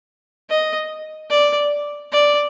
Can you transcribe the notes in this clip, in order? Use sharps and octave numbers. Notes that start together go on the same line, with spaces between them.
D#5
D5
D5